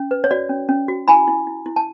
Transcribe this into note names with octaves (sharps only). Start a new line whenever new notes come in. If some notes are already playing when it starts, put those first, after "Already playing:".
Already playing: C#4
B4
C#5
F#4 D5
C#4
C#4
F#4
E4 G#5 B5
E4
E4
E4
A5